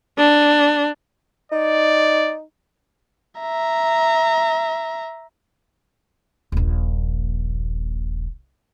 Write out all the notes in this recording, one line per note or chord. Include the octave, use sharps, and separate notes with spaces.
D4
D#4 D5
E5 A#5
D#1 A#1